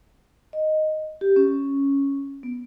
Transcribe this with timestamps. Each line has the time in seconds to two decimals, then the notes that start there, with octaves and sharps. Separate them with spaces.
0.53 D#5
1.21 G4
1.36 C#4
2.43 B3